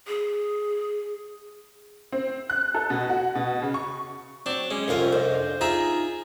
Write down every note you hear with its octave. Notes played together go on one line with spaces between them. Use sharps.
G#4
C4
F#6
A4
B2
F#4
B2
C#3
C#6
F#3 C4 D4 C#5
G#3 C#4
C2 F2 F4 A#4 C5 C#5
D4 G#4 C5 D#5
D#4 F4 G#4 E5 A#5